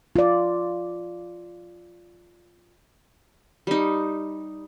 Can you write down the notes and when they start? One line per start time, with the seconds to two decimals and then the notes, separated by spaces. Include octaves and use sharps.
0.16 F4 D5
3.67 G3 D#4